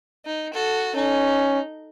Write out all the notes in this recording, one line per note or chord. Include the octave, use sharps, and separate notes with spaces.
D#4
F#4 A4
C#4 D#4